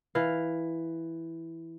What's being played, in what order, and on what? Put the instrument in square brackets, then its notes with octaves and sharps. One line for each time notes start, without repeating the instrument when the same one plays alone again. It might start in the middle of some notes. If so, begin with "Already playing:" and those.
[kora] E3 F5